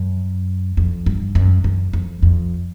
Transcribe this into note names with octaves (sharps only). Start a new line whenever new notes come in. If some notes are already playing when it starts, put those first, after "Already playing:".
Already playing: F#2
F2
G2
F#2
F#2
F2
F2